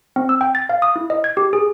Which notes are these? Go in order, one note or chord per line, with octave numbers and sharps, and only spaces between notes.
C4
E6
G5
A6
F5
D#6
E4
D#5
G#6
G4
G#4